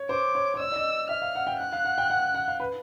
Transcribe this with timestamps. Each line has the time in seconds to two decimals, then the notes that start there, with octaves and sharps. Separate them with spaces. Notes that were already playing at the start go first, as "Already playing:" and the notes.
Already playing: C#5
0.09 C5 D6
0.35 C#5
0.54 C#5
0.59 D5 E6
0.72 D5
0.76 D#5
1.09 E5 F6
1.22 F5
1.35 F#5
1.47 G5
1.60 F#5 F#6
1.72 F5
1.85 F#5
1.98 G5
2.10 F#5
2.34 F#5
2.48 F5
2.60 B4